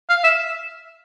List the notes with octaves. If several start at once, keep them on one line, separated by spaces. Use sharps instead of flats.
F5
E5